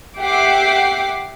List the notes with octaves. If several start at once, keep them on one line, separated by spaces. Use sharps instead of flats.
G4 E5 F#5 G5 D6 C7